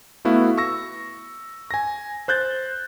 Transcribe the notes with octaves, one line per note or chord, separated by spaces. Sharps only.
A3 B3 E4 F#4 F5
C#6 E6 A#6
G#5 A#6
C5 F#6 G6 A6